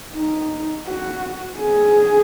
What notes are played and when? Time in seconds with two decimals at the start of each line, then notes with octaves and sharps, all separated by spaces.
0.15 D#4
0.87 F#4
1.59 G#4